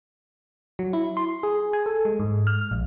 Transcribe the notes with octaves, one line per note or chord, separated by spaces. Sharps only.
F#3
E4
C6
G#4
G#5
A4
G#3
G#2
F6
A#1